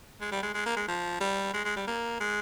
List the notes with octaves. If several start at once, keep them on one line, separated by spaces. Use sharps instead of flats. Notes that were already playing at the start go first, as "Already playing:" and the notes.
G#3
G3
G#3
G#3
A#3
G#3
F3
G3
G#3
G#3
G3
A#3
G#3